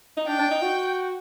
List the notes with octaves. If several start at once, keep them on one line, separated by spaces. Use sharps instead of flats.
D#4
D4 G5
D4
D#4
F#4